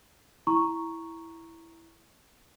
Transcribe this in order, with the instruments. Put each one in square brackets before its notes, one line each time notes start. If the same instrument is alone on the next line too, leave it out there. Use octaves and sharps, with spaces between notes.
[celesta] E4 A#5 C#6